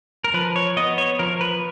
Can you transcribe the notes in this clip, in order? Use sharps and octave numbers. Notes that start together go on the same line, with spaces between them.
A#4
F3 B4
C#5
B3 D#5
C#5
F3 A#4
B4